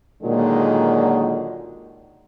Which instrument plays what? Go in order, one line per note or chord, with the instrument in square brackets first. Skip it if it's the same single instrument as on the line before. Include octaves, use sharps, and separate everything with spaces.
[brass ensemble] A#2 D3 D#3 F#3 G#3